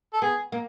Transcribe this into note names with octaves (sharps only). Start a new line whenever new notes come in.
A4
B3 G#4
A#3